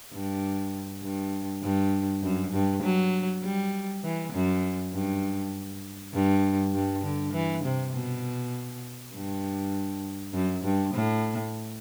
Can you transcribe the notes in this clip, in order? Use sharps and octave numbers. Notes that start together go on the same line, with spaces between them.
G2
G2
G2
F#2
G2
F#3
G3
E3
F#2
G2
G2
G2
D3
E3
C3
B2
G2
F#2
G2
A2